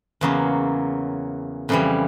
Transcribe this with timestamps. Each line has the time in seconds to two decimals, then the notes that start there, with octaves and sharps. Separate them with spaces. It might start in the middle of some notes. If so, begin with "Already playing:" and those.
0.21 E2 C#3 F#3 A#3
1.69 F2 C#3 E3 G3